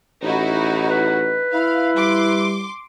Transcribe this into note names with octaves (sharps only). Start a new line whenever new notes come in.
A1 D#4 E4 F#4
B4
E4 F5
G3 C6 D6